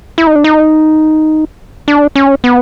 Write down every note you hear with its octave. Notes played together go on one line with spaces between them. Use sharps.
E4
D#4
D4
D#4
D4
C#4
B3